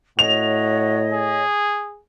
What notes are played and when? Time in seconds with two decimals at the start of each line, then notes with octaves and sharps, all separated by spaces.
0.19 A2 F#4 C#5 D#5 F7
1.12 G#4